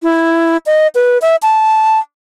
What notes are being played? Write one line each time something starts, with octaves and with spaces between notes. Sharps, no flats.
E4
D#5
B4
E5
A5